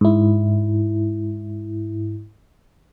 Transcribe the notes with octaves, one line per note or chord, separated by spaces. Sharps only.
G#2 E4